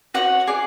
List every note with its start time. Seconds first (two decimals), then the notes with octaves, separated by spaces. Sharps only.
0.14 F#4 C#5 F#5
0.47 G#4 D5